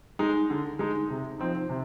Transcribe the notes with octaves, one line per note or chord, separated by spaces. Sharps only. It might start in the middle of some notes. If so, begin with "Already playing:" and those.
G#3 D#4
D3
G#3 D#4
C3
F3 C4 D#4
C3